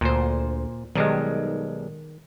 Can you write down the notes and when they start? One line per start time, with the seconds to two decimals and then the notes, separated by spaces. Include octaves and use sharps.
0.01 D2 A#2 C5
0.95 B1 D#3 G3 G#3